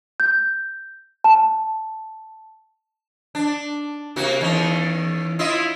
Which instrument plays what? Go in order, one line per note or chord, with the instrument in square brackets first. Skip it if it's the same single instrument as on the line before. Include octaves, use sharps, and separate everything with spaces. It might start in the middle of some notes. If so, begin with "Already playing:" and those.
[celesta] G6
A5
[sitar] D4
C3 A#3 F#4
E2 D#3 C#4
E4 F4 D#5